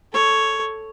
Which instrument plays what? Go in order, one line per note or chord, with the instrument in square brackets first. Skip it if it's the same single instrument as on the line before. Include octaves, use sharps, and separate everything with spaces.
[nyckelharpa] A4 C#5